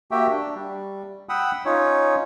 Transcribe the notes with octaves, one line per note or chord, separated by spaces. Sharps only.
A#3 F#4 G4 E5 G5
D4
G3
F#5 G5 B5 D#6 E6
C#4 D#4 F4 C#5